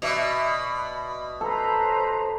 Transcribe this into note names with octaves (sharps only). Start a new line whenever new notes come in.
B2 D5 E5 B5
A4 B4 C5 A#5